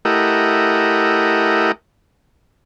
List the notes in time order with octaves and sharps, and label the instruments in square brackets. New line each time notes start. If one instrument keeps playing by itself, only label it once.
[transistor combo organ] A3 E4 G4 A#4 D#5 F#5